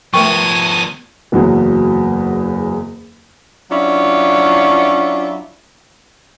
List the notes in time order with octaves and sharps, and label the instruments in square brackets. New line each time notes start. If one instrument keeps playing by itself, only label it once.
[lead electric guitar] F3 B3 [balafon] A3 A#4 G5 [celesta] C#6 [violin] D#7
[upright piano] F#1 E2 F#3 G#4
[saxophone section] F#3 C#4 D4 E4 F4